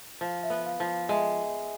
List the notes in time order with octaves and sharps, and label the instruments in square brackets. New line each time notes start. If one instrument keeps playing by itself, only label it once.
[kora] F3 [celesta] F5
[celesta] E5
[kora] B3
[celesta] F5
[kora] F3
[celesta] F5
[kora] G#3 [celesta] E5